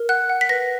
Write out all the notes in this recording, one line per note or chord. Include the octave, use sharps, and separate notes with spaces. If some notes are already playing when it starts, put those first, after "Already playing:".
Already playing: A#4
F#5 F#6
F#5
B6
B4 A#6